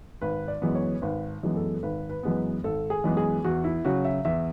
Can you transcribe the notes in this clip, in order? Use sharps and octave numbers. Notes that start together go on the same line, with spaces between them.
G#1 B4
D5
F#2 E3 G#3 B3
C#5
G#1 B4
F#2 E3 G#3 B3
A4
G#1 B4
B4
F#2 E3 G#3 B3
G#1 A4
G#4
F#2 E3 G#3 B3
G#4
E2 F#4
E4
C#3 F#3 F#4
E5
E2 E5